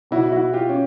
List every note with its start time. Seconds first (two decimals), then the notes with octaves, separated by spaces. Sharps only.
0.11 B2 E4 F#4
0.32 E4 F#4
0.53 F4 G4
0.69 C#4